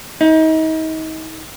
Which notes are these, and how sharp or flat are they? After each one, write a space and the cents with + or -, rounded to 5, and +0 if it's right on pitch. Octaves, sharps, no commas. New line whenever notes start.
D#4 +35